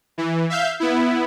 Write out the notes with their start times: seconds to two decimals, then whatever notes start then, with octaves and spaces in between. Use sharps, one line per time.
0.18 E3
0.50 E5 F5 G6
0.80 B3 E4